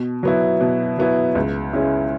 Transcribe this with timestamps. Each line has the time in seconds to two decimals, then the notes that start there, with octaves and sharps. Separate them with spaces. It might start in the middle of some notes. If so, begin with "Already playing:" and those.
Already playing: B2
0.23 F#3 B3 E4
0.61 B2
0.98 F#3 B3 E4
1.35 C#2
1.73 C#3 G#3 C#4 E4